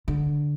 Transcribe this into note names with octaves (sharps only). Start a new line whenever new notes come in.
D3